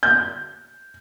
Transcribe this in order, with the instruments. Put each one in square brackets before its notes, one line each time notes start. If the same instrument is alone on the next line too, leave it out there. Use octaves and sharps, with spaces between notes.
[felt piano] G6